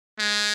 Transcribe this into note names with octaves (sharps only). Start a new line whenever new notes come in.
G#3